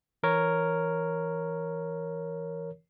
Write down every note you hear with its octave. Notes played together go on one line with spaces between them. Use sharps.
E3 A#4 C#5